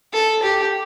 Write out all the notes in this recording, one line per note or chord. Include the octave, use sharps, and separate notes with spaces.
A4
G4